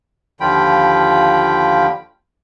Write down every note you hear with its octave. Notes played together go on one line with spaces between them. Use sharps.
D#2 D3 F3 F4 G5 B5